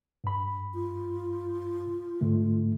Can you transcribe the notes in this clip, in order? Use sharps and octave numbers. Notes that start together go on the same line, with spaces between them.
G2 B5
F4
G#2 D3 A3